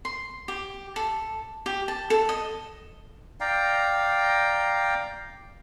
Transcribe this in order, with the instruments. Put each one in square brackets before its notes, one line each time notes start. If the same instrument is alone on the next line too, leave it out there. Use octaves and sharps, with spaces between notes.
[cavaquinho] C6
G4
A4
G4
A5
A4
D#5
[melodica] D5 F5 G5 A#5